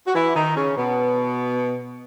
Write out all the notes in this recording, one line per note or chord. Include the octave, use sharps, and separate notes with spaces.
F#4
E3 E4
D#3 D#4
C#3 C#4
B2 B3